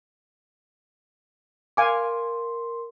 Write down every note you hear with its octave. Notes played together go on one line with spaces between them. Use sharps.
A#4 F5 G#5 C6 D6